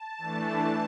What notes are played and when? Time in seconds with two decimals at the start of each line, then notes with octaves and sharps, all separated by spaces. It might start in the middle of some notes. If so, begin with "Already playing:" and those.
Already playing: A5
0.18 E3 A3 D4